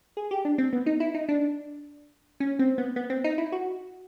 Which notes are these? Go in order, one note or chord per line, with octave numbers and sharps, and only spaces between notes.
G#4
G4
D4
C4
B3
D#4
E4
D#4
D4
C#4
C4
B3
B3
C4
D#4
E4
F#4